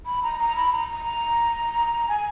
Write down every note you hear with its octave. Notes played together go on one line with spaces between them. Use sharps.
B5
A#5
A#5
B5
A#5
A#5
G#5